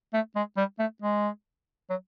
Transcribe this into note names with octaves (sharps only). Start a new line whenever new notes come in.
A3
G#3
G3
A3
G#3
F#3